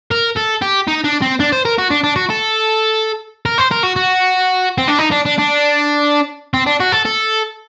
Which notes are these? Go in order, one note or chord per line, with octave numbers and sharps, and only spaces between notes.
A#4
A4
G4
D#4
D4
C4
D4
C5
A#4
F#4
D4
D4
F#4
A4
A#4
C5
A#4
F#4
F#4
C4
D4
D#4
D4
D4
D4
C4
D4
F#4
A4
A4